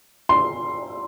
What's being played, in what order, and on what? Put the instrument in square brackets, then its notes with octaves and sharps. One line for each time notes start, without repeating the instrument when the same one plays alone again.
[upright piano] C6